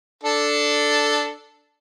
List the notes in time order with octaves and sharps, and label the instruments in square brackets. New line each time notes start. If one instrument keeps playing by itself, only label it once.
[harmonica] D4 A4